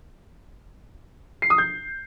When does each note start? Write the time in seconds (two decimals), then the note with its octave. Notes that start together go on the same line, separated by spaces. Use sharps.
1.42 C7
1.50 D#6
1.58 G6